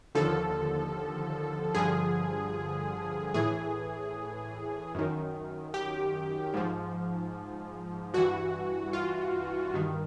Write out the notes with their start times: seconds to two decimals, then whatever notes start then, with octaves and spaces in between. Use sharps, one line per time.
0.15 D#2 D3 F3 A4
1.75 G2 D3 F3 G#4
3.34 A2 E3 G#4
4.94 F#2 D#3
5.74 G4
6.54 G#2 F3
8.14 G2 E3 F#4
8.93 F4
9.74 G2 D#3